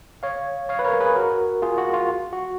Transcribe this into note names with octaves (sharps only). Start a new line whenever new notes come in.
C#5 F5
C#5 F5
B4
A#4 C#5
G#4 B4
F#4 A#4
F4 G#4
F#4
F4
F#4